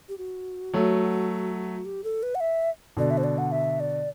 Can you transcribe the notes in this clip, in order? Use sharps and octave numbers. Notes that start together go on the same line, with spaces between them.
G4
F#4
F#3 A3
G4
A4
B4
F#5
E5
B2 D3 D5
E5
C5
D5
F#5
E5
D5